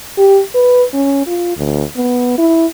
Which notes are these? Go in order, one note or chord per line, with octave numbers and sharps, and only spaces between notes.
G4
B4
C#4
F4
D2
B3
E4